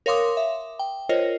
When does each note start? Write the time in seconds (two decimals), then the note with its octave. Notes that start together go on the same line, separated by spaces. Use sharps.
0.06 A#4 C#5 F5 C6 D6 D#6
0.37 E5
0.79 G5
1.09 F4 A#4 C5 C#5 D#5